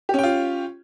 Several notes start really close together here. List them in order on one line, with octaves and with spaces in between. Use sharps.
G4 C#4 G5 F4